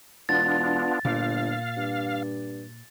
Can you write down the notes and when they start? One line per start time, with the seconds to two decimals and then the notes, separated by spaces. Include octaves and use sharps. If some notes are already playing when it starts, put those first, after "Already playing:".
0.29 E1 B3 D4 F4 A6
1.05 G1 A#2 F5
1.77 G2